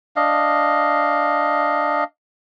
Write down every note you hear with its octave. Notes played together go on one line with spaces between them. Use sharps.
D4 D#5 F5